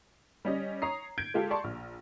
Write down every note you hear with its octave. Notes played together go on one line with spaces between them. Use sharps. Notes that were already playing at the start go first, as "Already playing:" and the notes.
G3 C#4 D#5
C#5 A#5 D#6 C7
G6 G#6 D7
G#3 F4 G4 A4
D5 A5 C6 C#6
A#1 F6